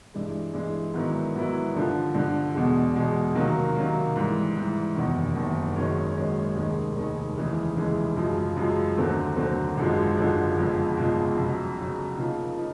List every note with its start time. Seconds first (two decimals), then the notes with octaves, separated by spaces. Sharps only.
0.14 G2 E3 G#3
0.54 G2 E3 G#3
0.94 G#2 D#3 F#3 B3 E4
1.35 G#2 D#3 F#3 B3 E4
1.75 G2 D3 F3
2.14 G2 D3 F3
2.54 E2 B2 G#3
2.95 E2 B2 G#3
3.35 C3 D#3 F#3 A#3
3.76 C3 D#3 F#3 A#3
4.16 G#2 E3 G3
4.56 G#2 E3 G3
4.95 F#1 E2 C3 D#3
5.35 F#1 E2 C3 D#3
5.76 G#1 F#2 D#3 G#3 C#4
6.16 G#1 F#2 D#3 G#3 C#4
6.56 F1 D#2 D#3 G#3
6.96 F1 D#2 D#3 G#3
7.37 F1 D#2 C#3 E3 G#3
7.76 F1 D#2 C#3 E3 G#3
8.16 F#2 C#3 F3 G#3
8.56 F#2 C#3 F3 G#3
8.97 D#2 D3 F#3 A3 C4
9.36 D#2 D3 F#3 A3 C4
9.77 G#1 F#2 D3 F3 G#3
10.17 G#1 F#2 D3 F3 G#3
10.57 G1 F2 C#3 F3 G#3
10.97 G1 F2 C#3 F3 G#3
11.37 F2 C#3 F#3
11.78 F2 C#3 F#3
12.18 C#3 F3 A#3 D#4
12.58 F3 D#4